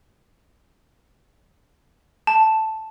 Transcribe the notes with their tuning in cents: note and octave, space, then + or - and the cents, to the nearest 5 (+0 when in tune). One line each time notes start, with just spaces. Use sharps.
A5 +0